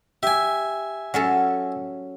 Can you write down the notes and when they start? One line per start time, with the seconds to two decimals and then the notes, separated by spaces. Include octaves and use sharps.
0.23 G4 E5 G#5
1.14 F#3 C#4 A4